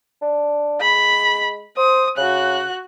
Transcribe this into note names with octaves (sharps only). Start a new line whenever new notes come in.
D4
G#3 B5
C5 D#6
C#3 F#4 F#6